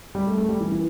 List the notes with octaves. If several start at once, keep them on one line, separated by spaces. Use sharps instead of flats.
G3
A3
A3
G3
E3
E3